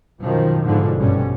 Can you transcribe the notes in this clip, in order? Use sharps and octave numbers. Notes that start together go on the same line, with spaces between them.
F#2 B2 D#3 F3
G#2 B2 D3 F3
A1 G2 B2 G3 C#4